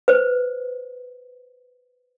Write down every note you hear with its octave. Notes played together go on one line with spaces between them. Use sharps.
B4 C5